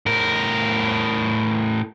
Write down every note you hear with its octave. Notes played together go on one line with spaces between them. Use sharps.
A2 A#4